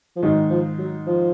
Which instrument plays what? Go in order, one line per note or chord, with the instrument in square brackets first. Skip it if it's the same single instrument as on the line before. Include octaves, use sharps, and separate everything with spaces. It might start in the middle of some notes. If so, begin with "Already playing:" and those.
[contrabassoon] F3
[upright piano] G#2 D#3 G#3 D#4 [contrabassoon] F#3
[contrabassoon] F3
F#3
F3